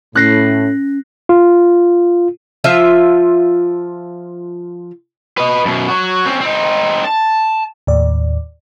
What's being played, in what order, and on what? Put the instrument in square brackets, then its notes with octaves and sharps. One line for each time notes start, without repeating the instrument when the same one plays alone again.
[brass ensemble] A2 [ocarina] C#4 [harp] F#6 A#6 C7
[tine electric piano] F4
[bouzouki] F3 F4 E5
[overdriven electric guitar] B4 D#5
F#2 B2
F#3 F#4
C4 C#4
C4 D#4
A5
[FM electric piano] D#2 A2 D5